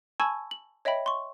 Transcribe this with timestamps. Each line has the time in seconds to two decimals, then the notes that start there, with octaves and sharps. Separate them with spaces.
0.20 G#5 A5 B5 C#6 E6 G#6
0.51 F#7
0.85 C#5 D#5 E5 G5 B5
1.06 C6 C#6